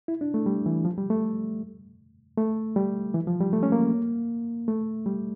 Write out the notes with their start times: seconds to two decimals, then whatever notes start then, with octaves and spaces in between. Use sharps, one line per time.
0.08 E4
0.21 D4
0.34 A3
0.46 G3
0.66 E3
0.85 F3
0.98 G3
1.10 A3
2.38 A3
2.76 G3
3.14 E3
3.27 F3
3.40 G3
3.53 A3
3.63 C#4
3.72 A#3
4.68 A3
5.06 G3